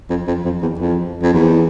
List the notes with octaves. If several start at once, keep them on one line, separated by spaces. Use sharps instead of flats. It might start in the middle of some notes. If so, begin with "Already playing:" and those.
F2
F2
F2
E2
F2
F2
E2